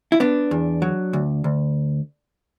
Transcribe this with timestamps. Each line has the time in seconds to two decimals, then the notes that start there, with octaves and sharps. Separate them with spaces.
0.12 E4
0.20 B3 D4
0.51 E2
0.82 F#3
1.13 D2
1.44 D2